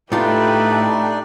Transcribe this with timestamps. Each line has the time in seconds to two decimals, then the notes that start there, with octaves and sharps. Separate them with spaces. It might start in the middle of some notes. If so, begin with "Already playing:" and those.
0.12 A2 A3 D4 D#4 F4 G4 B4 D5